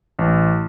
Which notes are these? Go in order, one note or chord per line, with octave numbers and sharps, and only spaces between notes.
A1